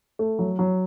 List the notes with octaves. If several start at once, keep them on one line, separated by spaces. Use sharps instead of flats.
A3
F#3
F#3